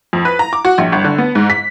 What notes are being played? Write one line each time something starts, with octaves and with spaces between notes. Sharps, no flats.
F2
B4
A#5
D6
F#4
A#1
G1
D3
B3
G#2
B6